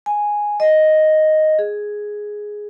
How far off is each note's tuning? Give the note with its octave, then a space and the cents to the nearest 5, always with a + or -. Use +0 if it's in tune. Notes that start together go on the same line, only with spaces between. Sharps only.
G#5 +0
D#5 +0
G#4 +5